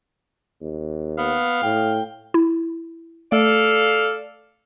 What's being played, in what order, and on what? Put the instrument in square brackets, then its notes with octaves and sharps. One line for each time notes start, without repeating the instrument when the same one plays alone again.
[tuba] D#2
[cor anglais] B3 [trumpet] F5
[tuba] A2 [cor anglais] G5
[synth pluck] E4
[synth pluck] A3 [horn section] A4 D5 F5